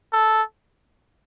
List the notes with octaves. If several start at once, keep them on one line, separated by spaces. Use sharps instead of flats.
A4